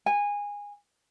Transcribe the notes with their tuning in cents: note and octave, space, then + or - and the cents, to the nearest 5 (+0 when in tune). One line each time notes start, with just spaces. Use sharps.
G#5 -20